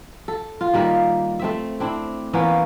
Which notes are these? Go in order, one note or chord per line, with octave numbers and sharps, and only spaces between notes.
A4
F4
D#3 G3 A#3
A3 C4 E5
C4 D4 E4
E3 A#3 B3 C#4